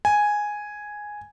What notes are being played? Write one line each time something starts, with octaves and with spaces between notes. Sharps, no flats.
G#5